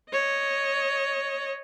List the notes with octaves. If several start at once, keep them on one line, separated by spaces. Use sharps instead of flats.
C#5 D#5